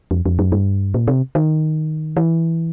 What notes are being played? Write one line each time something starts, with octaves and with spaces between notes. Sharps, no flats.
F2
F2
F#2
G2
A#2
C3
D#3
E3